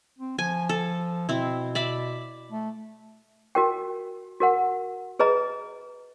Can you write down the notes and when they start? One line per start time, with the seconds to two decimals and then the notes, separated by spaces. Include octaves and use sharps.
0.18 C4
0.39 F3 G#5
0.69 A4
1.29 B2 C4 E4
1.75 D5 E5 B5
2.52 A3
3.55 F#4 A#4 G5
4.40 F#4 A#4 F#5
5.19 G#4 B4 D#5 A#5